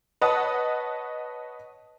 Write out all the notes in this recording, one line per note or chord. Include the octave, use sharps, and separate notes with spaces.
B4 C#5 D#5 F#5 A5 D#6